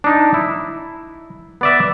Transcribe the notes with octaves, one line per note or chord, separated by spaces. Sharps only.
D4 D#4
E4
B3 D5 E5